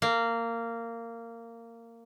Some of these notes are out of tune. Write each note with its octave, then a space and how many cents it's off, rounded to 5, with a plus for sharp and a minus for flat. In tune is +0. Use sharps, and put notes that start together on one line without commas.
A#3 -15